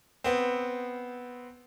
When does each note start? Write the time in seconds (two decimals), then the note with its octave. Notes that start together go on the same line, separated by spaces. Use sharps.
0.24 B3 C4